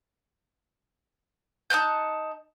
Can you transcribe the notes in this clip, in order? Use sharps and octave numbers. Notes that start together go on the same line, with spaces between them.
D#4 A5 F#6 G6